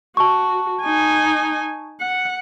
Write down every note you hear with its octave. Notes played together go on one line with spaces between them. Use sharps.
F#4 A5 C#6
D#4 G#5
F#5